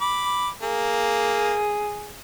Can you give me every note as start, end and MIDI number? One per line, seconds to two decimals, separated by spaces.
0.01 0.49 83
0.01 0.49 86
0.62 1.71 58
0.62 2.16 68